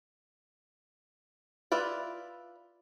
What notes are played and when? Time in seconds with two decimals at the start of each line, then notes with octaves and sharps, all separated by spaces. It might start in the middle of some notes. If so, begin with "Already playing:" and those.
1.72 E4 F4 B4 D5